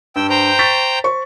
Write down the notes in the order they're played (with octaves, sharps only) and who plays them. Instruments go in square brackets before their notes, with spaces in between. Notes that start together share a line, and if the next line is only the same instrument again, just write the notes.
[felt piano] G2 [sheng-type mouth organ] G5 E6
[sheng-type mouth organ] C5 G5 A#5
[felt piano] C#6 A6 B6
C5 C#6